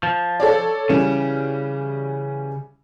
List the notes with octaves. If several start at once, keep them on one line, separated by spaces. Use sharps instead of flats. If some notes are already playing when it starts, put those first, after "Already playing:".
F3
A4 C#5 D5
C#3 E3 G3 C#4